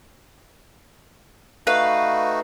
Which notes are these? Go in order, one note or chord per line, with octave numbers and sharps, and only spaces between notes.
A3 D#4 F#4 B4 F5